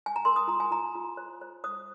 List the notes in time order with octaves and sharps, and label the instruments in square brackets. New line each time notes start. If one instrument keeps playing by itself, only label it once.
[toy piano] G#5
A#5
A#4 C6
D#6
F4 A#5
G#5
F4 A#5
F4
C5
C5
C5 D#6